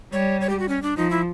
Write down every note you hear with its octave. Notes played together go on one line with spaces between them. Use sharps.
G3 C#5
C#5
G4
F#4
C#4
D4
F3 D#4
E4